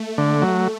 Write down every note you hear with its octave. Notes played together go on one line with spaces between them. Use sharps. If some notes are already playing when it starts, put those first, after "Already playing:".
Already playing: A3
D3
F#3